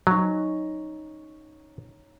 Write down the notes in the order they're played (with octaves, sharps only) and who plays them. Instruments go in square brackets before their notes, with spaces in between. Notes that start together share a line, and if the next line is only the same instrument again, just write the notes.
[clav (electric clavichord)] F#3 [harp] C#4 D#4